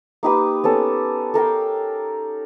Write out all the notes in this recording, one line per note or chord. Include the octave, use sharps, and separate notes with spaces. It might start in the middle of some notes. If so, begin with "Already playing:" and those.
A#3 D#4 G4 B4
B3 C#4 A4
A4 A#4 F5 G5